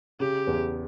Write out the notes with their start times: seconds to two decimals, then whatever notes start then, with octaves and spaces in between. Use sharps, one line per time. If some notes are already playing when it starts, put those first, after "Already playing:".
0.20 C#3 G4
0.47 E2